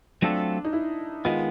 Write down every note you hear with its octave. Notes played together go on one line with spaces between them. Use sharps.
F#3 A3 C4 D4 F4 A4
D#4
E4
D#3 G#3 B3 F4